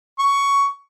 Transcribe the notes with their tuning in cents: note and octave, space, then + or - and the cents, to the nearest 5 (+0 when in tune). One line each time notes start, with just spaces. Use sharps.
C#6 +10